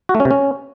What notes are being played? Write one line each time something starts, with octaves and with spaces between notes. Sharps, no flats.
F#4
A3
C#4
C3
C#4